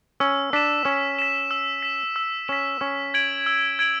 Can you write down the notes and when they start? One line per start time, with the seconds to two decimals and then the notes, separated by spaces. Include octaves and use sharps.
0.20 C#4 E6
0.53 D4 B6 E7
0.85 C#4 E6
1.19 B6 E7
1.51 E6
1.83 B6 E7
2.16 E6
2.48 C#4 B6 E7
2.81 C#4 E6
3.14 G#6 D7 F#7
3.46 E6
3.79 G#6 D7 F#7